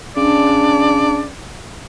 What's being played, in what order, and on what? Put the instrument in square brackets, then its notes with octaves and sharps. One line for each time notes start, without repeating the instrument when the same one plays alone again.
[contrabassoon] C#3 [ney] D4 [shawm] D5